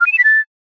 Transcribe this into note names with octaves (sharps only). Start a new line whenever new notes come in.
F6
D#7
E7
B6
A6